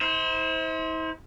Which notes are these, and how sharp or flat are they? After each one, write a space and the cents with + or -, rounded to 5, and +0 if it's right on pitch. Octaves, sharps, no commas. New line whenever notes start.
E4 -45 C5 +0